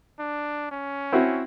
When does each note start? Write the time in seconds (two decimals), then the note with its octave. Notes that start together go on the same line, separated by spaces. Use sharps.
0.19 D4
0.71 C#4
1.12 C4 E4 F#4